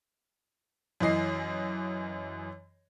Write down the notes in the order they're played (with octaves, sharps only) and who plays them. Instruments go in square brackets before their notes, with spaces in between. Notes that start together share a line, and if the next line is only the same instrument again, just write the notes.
[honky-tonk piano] F#2 E3 D#5 C7